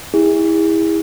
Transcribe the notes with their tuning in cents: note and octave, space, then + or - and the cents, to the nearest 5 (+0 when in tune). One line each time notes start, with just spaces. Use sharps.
E4 -15 G#4 -35